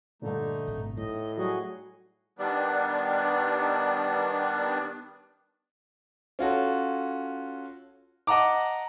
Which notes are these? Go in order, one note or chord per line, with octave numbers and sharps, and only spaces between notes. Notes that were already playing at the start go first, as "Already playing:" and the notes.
G2 A#2 D3 A3 D#4
G#1 B2
A2 D#4 D#5
F#3 G3 F#4 G#4 D#5
D#3 G3 B3 D4
C#4 F4 F#4 A4
D#5 F#5 A5 A#5 D6